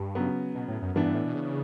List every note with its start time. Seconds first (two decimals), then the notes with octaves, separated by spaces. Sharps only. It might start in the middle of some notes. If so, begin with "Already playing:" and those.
Already playing: G2
0.15 C#3 F#3 B3
0.55 B2
0.68 A2
0.82 F#2
0.94 G2 E3 B3 D4
1.05 G2
1.14 A2
1.25 B2
1.35 C#3